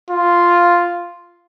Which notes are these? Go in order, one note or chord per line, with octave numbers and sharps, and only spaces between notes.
F4